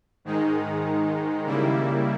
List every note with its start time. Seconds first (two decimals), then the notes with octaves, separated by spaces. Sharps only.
0.25 G#2 D#3 G#3 D#4
1.46 C#3 G3 A#3 E4